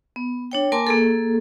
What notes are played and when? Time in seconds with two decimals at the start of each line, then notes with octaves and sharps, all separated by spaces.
0.16 B3
0.52 D4 C#5 G5
0.72 A#3 A#4 G#5 A5 C6 D6
0.87 A#3 G#4 A4